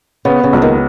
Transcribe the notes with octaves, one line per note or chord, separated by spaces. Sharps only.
C#3 B3
C#3
C#2
D#2 D#3